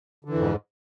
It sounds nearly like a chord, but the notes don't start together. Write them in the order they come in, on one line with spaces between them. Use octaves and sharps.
D3 E3 F2 G#2